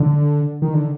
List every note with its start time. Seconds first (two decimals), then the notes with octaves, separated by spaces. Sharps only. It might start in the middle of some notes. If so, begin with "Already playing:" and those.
Already playing: D3
0.62 D#3
0.74 D3